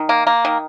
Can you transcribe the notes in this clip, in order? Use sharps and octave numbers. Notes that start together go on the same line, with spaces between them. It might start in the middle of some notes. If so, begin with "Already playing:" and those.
Already playing: D#3
A#3
A#3
D#3